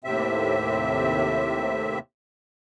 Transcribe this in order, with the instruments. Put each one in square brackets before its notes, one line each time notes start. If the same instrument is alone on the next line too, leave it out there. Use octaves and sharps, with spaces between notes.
[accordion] D#2 A2 C3 C4 E5